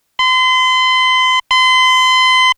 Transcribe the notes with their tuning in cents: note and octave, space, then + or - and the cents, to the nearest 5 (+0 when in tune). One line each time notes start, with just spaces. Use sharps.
C6 -35
C6 -35